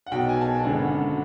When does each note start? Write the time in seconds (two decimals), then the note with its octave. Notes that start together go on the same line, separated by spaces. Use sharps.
0.07 F#5
0.11 B1 B2 G5
0.29 G#5
0.41 A5
0.47 G#5
0.63 G#1 F#2 D3 F#5